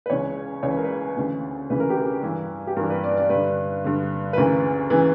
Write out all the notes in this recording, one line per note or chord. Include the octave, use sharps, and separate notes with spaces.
B4
C#2 C#3 E3 C#5
C#2 C#3 E3 C#5
B4
A#4
B4
D2 C#3 E3
D2 C#3 E3 B4
A#4
G4
A#4
G2 E3
G4
G2 E3 A#4
B4
D5
D5
G2 D3 B4
G2 D3
B4
D2 C#3 E3 A#4
C#3 E3